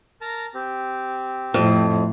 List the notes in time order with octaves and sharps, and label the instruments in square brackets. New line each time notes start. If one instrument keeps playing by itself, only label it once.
[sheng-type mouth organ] A#4 A5 A#5
C4 G4
[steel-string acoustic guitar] F2 [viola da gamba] A2 F3